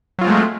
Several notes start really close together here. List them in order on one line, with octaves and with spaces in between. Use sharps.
F#3 F4 C4 G#3 A3